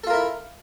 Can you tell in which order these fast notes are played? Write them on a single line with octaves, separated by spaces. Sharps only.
A4 F4 A#4 E4